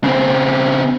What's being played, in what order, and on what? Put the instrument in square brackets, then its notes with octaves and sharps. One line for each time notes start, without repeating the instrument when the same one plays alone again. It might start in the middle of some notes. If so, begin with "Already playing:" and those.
[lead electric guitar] C#3 C4